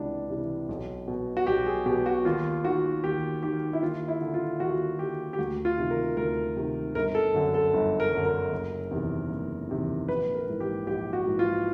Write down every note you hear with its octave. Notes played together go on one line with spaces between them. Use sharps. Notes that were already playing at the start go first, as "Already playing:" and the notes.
Already playing: C#2 C3 E3 D4
C3 E3
B1
B2
F#4
B1 G4
G#4
B2 G4
F#4
D#2 F4
D#3 F#4
D#2 G4
D#3 G4
E4
D#2 F4
E4
D3
F4
D#2 F#4
D3 G4
G4
D2 F#4
F4
C3 D#3
A#4
D2 A#4
C3 D#3
G1 A#4
A4
F#2 D3
A4
G1
A#4
F#2 D3
A#4
F#1
E2 C3 D#3
F#1
E2 C3 D#3
A#1 B4
A#4
G#2 E3
G4
A#1 G4
F#4
G#2 E3
F4